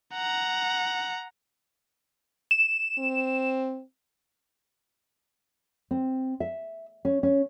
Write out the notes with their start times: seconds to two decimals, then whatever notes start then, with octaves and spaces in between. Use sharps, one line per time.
0.14 F#5 A#5
2.51 E7
2.98 C4
5.91 C4
6.40 E5
7.05 C#4
7.23 C#4